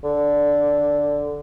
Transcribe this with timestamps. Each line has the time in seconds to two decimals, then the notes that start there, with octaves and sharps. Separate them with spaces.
0.04 D3